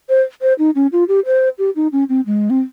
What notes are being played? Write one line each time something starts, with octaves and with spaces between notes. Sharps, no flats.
C5
C5
D#4
C#4
F4
G4
C5
G4
D#4
C#4
C4
G#3
C4